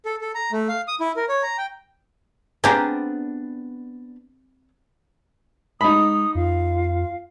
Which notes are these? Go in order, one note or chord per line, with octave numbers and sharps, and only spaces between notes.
A4
A4
A#5
A3
F5
D#6
E4
A#4
C#5
A#5
G5
B3 C4 D4 G4 G#4 F5 A#5
G#3 D#4 B5 D#6
F2 F4 F5